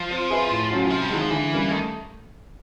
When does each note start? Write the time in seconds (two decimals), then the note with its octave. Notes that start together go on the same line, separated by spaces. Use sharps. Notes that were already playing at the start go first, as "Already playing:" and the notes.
Already playing: F3
0.10 C4
0.30 F4 G#4 B4 E5
0.50 A2
0.70 F#3 A3 C#4 F#4
0.86 E3
0.90 C3 F3
1.02 G3
1.11 D#3 F#3 G#3
1.21 F3
1.30 D3 E3
1.51 G3 A#3 C#4
1.71 D#3 A3